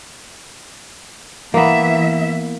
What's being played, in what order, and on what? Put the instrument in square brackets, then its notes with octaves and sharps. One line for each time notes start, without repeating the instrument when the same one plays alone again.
[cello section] E3 E5 [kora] A#3 B3